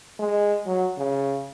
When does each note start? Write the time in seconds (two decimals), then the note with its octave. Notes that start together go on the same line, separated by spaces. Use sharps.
0.19 G#3
0.67 F#3
0.98 C#3